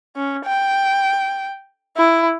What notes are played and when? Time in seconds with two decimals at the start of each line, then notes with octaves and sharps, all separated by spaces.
0.16 C#4
0.45 G5
1.97 E4